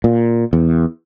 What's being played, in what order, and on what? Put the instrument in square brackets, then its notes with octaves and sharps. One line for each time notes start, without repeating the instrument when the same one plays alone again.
[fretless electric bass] A#2
E2